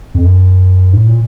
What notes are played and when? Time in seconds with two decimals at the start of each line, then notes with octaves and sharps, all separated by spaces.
0.15 F2
0.23 F#2
0.93 A2
1.07 A#2